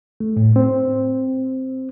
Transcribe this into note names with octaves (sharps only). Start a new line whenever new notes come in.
A3
A2
C4